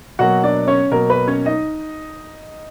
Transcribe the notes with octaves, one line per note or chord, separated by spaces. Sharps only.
B2 F#3 A#3 F#4 F#5
D4 D5
C#4 C#5
B2 F#3 A#3 A#4
B4
C#4 C#5
D#4 D#5